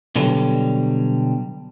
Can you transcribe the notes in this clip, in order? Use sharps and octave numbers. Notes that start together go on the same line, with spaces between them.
B2 D3 F#3 G3